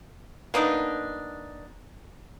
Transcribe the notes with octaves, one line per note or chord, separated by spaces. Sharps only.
A#3 B3 D4 D#4